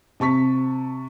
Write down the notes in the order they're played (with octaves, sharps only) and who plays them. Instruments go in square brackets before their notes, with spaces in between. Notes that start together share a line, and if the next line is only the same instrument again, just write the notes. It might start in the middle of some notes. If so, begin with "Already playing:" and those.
[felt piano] C3 A5 C#6 B6